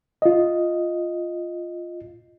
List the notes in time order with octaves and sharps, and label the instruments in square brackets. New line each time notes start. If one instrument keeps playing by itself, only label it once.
[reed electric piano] F4 D#5